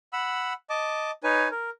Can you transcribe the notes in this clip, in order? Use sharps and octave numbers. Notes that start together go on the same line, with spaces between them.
F#5 B5 E6
D#5 A5 D6
D#4 B4 C#5 G#5
A#4